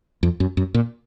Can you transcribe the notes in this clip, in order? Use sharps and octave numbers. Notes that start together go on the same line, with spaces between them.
F2
F#2
F#2
A#2